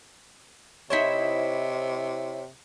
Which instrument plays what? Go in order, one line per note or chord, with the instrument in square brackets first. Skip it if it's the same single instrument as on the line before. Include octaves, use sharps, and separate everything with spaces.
[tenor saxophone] C3 [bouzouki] D#4 E4 C5 [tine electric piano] C#5 B6